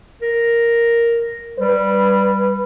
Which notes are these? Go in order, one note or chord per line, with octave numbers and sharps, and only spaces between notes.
A#4
G3 B4